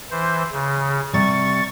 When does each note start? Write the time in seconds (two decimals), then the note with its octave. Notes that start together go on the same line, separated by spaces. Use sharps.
0.11 E3 C5
0.52 C#3
1.13 C3 G3 C#6 A6